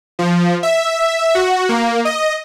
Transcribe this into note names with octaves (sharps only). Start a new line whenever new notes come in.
F3
E5
F#4
A#3
D#5